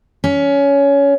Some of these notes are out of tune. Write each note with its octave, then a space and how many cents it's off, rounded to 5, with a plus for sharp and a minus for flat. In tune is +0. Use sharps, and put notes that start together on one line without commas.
C#4 +20